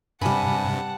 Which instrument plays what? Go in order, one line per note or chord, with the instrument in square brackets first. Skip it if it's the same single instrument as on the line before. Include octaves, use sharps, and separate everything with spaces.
[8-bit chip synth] G2 C3 [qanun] G3 B5 [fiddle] F#5 A5 [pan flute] G#5